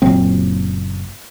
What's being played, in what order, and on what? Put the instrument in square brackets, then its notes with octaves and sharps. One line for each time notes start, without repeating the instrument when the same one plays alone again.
[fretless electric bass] F#1 A#2 F#3 C4